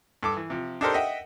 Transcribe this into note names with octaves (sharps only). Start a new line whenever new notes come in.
G2 A4 D6
E3
C3 F3
D4 D#4 G4 A4 A#4 C5
D#5 E5 F#5 G5